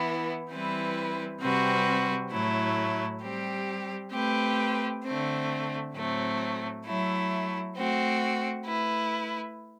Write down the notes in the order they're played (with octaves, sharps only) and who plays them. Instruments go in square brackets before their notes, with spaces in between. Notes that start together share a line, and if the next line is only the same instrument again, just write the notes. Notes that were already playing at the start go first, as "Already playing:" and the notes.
Already playing: [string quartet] E3 B3 E4
E3 G3 C4 E4 B4
C3 G3 C4 F#4 B4
A2 F#3 A3 E4
G3 C4 G4
A3 C4 G4 B4
D3 A3 C4
A2 F#3 A3 C4
F#3 A3 E4
A3 C4 F#4
A3 E4 B4